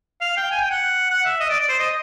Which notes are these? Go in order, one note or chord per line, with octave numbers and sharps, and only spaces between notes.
F5
G5
G#5
G5
F#5
F#5
E5
D#5
D5
D5
C5
D#5